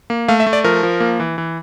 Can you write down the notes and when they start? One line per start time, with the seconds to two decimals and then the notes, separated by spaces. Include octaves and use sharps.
0.10 A#3
0.28 A3 F5
0.40 E5
0.47 A3
0.53 D5
0.64 F3 A#4
0.83 F3
1.00 A#3
1.20 E3
1.38 E3